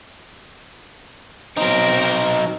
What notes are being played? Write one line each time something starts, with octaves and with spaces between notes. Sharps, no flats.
F#3 C4 D#4 A#4